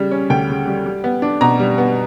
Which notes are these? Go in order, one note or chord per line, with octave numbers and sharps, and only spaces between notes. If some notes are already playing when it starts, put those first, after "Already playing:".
Already playing: C#3 G3
C#4
D2 G5
C#3
G3
G3
B3
D4
B2 A#5
G3
B3